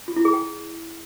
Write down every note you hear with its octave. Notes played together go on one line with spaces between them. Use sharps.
F4
E4
G#4
G5